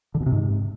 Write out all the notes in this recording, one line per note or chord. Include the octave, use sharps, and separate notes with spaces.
D3
B2
C3
G#2